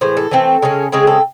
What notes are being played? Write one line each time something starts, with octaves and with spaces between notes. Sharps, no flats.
A2 E3 G#3 C5
A4
E3 A3 C4
C#3 G#3 C#4
C#3 G#3 C4 G#4
A4